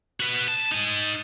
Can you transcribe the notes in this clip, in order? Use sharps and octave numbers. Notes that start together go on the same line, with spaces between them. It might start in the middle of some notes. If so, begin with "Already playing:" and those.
F#4 B4
A5
D#4 G#5